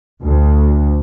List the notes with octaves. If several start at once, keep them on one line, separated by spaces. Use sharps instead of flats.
D2